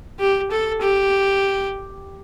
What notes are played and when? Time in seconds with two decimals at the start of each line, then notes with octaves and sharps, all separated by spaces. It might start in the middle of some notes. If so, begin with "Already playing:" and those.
0.20 G4
0.51 A4
0.81 G4